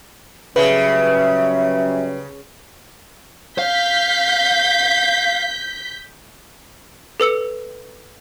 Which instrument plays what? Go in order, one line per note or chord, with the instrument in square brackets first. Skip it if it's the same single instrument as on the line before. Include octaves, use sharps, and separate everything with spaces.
[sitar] C#3 [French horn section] F#3 G3 C#4 [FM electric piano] B4 [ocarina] E5
[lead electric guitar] F5 [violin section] G6 B6
[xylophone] A4 B4 E6 C#7